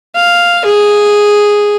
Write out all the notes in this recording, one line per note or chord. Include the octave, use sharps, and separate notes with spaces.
F5
G#4